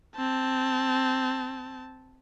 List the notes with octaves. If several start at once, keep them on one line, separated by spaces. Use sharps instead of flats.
C4 A5